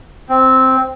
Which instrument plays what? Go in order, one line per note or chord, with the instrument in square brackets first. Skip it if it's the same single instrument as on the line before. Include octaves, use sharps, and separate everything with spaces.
[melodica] C4